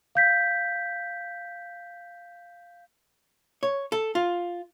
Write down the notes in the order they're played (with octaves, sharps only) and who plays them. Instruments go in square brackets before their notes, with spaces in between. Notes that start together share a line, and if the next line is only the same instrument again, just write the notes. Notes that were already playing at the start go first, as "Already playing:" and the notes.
[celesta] F5 G6 B6
[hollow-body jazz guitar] C#5
A4
F4